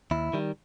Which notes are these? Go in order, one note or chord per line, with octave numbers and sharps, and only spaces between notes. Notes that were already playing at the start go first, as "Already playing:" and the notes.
D#2 E4
D#3 G3